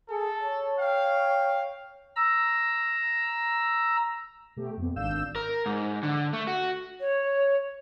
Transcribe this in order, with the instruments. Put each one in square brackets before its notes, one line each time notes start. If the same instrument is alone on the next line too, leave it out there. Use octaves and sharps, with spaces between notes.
[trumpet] G#4 [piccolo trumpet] A4
[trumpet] C#5 [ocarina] A5
[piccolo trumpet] F5 [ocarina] G5
[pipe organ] A#5 E6
[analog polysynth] B2 A3 G4
F2 B3
G#1 D4 F5 E6 G6 E7
[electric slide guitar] A#4
G#2
D3
A3
F#4
[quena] C#5